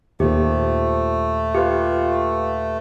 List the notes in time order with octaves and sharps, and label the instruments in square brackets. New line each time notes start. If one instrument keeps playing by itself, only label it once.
[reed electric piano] D#2 A#2 [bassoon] F3 [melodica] A3 [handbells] G4
[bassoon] F4 [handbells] G4 B4